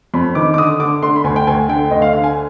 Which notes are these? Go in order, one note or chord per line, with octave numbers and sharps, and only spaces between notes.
F2 B5
D#3 D6
D6
D3 D#6
D3 D6
D3 C6
B5
D2 G#5
G5
D2 G#5
D3 G5
D2 D#5
F5
D3 F5
G#5